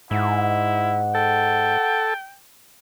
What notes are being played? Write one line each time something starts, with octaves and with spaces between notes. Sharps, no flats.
G#2 E4 F#5
A4 G5